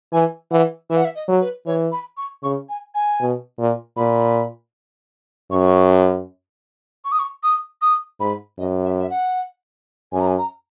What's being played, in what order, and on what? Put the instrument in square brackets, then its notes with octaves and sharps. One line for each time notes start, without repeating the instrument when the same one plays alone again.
[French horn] E3 [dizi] G#5
[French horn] E3 [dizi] F#5
[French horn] E3 [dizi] E5
[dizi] F#5
E5
D#5
[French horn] F#3
[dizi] B4
[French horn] E3 [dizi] C#5
[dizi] B5
C#6
[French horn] C#3 [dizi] C#6
[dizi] G#5
G#5
[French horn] B2
A#2
[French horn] A#2 [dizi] B5
[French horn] F#2 [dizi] C#6
[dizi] C#6
D#6
C#6
D#6
D#6
[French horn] G#2 [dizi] B5
[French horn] F#2 [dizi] D#5
[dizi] E5
E5
F#5
[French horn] F#2 [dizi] G#5
[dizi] A#5
G#5
A#5